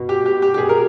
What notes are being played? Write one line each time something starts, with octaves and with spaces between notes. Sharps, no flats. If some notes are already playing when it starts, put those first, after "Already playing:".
Already playing: B2
G4
G4
G4
G4
B2 G#4
A#4